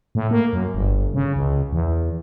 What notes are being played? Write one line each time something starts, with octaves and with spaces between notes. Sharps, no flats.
A2
A#3
F#2
G1
C#3
C#2
E2